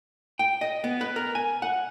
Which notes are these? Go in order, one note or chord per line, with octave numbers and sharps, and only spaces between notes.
G5
D#5
B3
B4
A#4
G#5
F#5